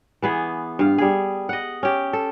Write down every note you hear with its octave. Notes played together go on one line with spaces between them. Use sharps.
E3 B3 G#4
G2 F5
G3 G#4
D#5 F#5
C#4 G4
A4